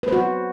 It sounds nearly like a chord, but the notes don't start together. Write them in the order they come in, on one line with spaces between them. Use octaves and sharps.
B4 C5 F#4